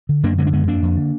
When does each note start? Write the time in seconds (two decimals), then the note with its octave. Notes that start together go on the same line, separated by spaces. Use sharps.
0.09 D3
0.23 F#2 A#3 D4
0.38 D3 G#3 B3
0.47 D4
0.53 F#2 G#3 B3
0.67 F2 A#3 D4
0.83 F2
0.97 D3